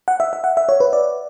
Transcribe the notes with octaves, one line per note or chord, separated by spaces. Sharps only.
F#5
E5
E5
F#5
E5
C#5
B4
D5